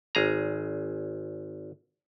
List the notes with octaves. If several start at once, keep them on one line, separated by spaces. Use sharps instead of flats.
G#1 G#4 A#5